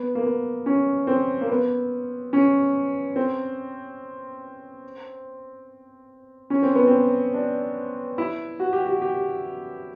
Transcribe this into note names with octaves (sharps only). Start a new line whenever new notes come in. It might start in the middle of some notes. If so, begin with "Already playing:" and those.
Already playing: B3
A#3
B3
C#4
C4
A#3
B3
C#4
C4
C#4
C4
B3
C4
D4
E4
F#4
G4
F#4
G4